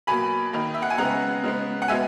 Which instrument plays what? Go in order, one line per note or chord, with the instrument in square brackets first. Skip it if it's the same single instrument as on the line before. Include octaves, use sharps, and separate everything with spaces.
[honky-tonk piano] B2 F#3 A#3 G#5 B5
D#3 A#3
E5
F#5
G#5
C#3 G#3 B3 F#5 A#5
C#3 G#3 B3
F#5
B2 G#3 B3 E5 G#5